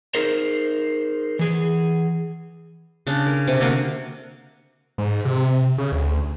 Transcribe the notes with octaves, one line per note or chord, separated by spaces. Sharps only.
D#4 G#4 A#4 C5
E3 G#4
C#3 D4
A#4
C3
D3 A#3 F#4 A#4
G#2
C3
C#3
D2